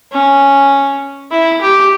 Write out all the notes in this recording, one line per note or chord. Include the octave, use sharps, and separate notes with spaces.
C#4
E4
G4